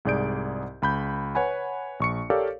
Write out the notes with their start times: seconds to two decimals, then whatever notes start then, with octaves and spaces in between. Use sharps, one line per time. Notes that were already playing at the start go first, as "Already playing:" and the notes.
0.05 C2 G#2 G#4 D5 G6 D7
0.82 C#2 B5 G6
1.35 B4 C#5 F#5 G#5 B5
2.00 A#1 C#6 C#7
2.30 G4 A4 A#4 C#5 D5 F5